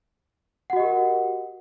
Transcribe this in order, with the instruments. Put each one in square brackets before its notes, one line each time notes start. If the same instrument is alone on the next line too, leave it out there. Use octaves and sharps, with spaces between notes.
[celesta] F#5
F#4
D#5
G4
A#4